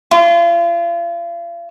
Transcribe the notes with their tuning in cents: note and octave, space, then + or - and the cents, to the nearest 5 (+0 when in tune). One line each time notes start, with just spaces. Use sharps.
F4 -40